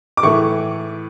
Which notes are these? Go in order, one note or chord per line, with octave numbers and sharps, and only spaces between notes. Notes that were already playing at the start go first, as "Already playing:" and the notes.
D6
A2 E3 A3 C#6